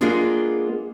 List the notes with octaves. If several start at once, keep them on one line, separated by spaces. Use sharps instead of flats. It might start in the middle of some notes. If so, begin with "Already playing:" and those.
G#3 A#3 B3 D4 F4 G#4